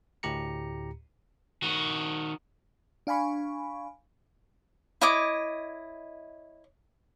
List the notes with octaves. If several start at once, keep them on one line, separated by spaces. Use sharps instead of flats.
D2 A2 G4 A#5 C#7
D#3 F#4
D4 F5 G#5 B5 C#6
E4 C#5 D#5 D6